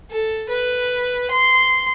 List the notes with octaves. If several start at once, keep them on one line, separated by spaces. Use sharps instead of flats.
A4
B4
C6